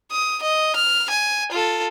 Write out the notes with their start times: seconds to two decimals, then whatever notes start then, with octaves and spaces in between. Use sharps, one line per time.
0.11 D#6
0.42 D#5
0.76 F6
1.10 G#5
1.51 F4 A4